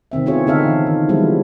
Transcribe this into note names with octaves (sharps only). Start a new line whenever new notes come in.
C3 D#3 C4 E5
B3 C4 E4 F4 G#4 C#5
D3 C4 D#4 A4 E5 F5
E3
D#3
E3 F3 G3 G#3 B3 E4